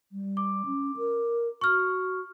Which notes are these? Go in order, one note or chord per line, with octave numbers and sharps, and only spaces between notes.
G3
D6
C#4
A#4
F#4 C#6 F6